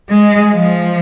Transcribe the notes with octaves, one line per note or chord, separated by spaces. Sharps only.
G#3
F3